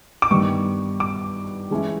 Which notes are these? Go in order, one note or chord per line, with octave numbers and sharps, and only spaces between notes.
D6
G2 D#3 G3 B3 D#4 C#6
D6
E3 G#3 C#4 E4